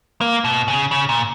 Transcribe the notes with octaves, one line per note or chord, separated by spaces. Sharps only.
A#3
B2
C#3
C#3
A#2